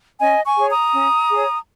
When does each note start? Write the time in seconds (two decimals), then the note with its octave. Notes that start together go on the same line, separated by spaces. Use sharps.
0.20 C#4 D#5 G#5
0.45 G#5 C#6
0.58 G#4 C#5
0.70 A#5 D#6
0.94 C#4
1.30 G#4 C#5